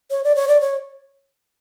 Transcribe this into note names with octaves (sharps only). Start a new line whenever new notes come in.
C#5
D5
C#5
D5
C#5